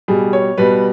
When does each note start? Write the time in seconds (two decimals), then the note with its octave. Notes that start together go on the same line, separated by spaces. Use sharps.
0.08 B2 G3 G#4
0.33 C#5
0.58 B2 G3 B4